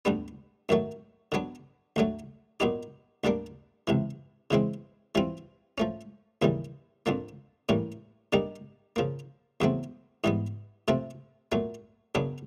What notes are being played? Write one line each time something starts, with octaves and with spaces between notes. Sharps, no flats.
D2 D3 G3 B3
F#2 D#3 F#3 A3
D3 F#3 B3 D4
D2 D3 F#3 A3
A#2 F#3 B3 D#4 G4
D2 D3 G3 A#3 D4
C#2 C3 E3
C#3 E3 G#3 C4
E3 G3 C4 F4
F3 A3 C#4
D#2 C#3 E3 G3
F2 D3 F3 A#3
A2 E3 G3 A#3 C#4
D3 G3 A#3 D#4 G4
C#3 F3 A#3
E2 C#3 F#3 A3 C4
G#2 E3 G3 B3
C3 F3 A3 C4
A#2 F#3 A3
F#2 C#3 F#3 B3 D4